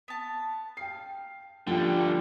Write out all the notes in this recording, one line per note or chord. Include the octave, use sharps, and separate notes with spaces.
B3 A5
F5 G5 C7
D3 F3 G3 G5